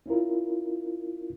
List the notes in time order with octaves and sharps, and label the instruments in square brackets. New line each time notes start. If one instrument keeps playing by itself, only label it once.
[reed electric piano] C#4 E4 F4 A#4